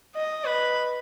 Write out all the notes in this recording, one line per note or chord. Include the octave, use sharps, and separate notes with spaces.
D#5
B4